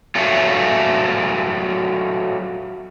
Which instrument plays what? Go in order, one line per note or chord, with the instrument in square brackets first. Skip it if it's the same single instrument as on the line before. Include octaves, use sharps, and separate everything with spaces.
[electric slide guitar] F#3 A3 C#4 F4